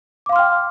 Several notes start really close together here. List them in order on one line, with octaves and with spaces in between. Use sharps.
D6 F5 C6 F6 G5